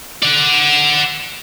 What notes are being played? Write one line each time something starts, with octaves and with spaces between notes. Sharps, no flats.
D5 F#5